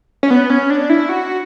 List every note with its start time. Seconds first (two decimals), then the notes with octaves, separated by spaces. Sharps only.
0.23 C#4
0.30 B3
0.50 C#4
0.70 D4
0.90 E4
1.09 F#4